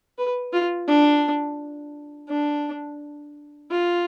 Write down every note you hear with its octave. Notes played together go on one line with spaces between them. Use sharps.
B4
F4
D4
D4
F4